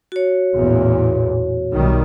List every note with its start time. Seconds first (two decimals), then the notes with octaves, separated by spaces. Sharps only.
0.12 F#4 C#5
0.54 A1 E2 A#2
1.72 B1 D#3 G3